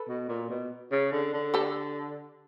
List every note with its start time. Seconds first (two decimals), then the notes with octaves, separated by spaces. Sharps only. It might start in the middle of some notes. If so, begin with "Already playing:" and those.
Already playing: A4 B4
0.08 B2
0.29 A#2
0.50 B2
0.92 C#3
1.12 D3
1.33 D3
1.54 G4 A4